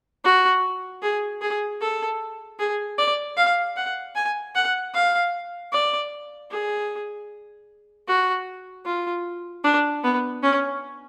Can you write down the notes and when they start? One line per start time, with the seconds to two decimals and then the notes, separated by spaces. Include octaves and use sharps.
0.24 F#4
1.02 G#4
1.42 G#4
1.81 A4
2.59 G#4
2.98 D5
3.37 F5
3.77 F#5
4.16 G#5
4.55 F#5
4.94 F5
5.72 D5
6.51 G#4
8.08 F#4
8.86 F4
9.64 D4
10.04 B3
10.43 C#4